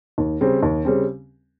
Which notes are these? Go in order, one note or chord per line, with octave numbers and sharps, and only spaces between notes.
D#2
C#3 G3 C4
D#2
C#3 G3 C4